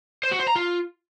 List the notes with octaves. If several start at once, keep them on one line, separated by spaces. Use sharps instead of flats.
C5
F#4
C5
A#5
F4